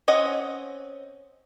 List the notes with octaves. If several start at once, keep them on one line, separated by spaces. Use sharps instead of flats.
C4 C#4 D#5 F#5